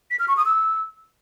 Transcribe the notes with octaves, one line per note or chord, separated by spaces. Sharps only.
B6
F6
C#6
D#6
E6